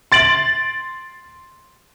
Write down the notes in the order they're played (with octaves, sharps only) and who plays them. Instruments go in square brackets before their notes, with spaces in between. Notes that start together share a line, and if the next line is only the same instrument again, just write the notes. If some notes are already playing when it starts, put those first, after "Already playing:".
[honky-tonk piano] C6 A6 D7 F#7